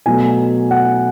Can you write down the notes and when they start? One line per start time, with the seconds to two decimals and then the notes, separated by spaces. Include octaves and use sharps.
0.06 B2 F#3 A3 G#5
0.71 F#5